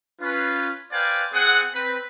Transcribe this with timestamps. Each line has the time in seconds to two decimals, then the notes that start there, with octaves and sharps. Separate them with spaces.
0.20 C#4 F4 B4
0.92 B4 C5 D5 F5 G5 G#5
1.33 C4 G#4 F#5
1.74 C4 B4 B5